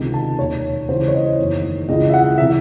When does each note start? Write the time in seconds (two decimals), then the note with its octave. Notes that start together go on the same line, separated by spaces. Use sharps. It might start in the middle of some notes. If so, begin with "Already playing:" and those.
Already playing: C#2 C3 D#3
0.14 A5
0.39 E1 D#2 D#3 C#5
0.88 C#2 C#3 E3 C5
1.08 C#5
1.14 D#5
1.38 F#1 E2 D#3
1.88 C#2 C#3 E3 D#5
2.09 E5
2.14 F#5
2.38 C3 E3 E5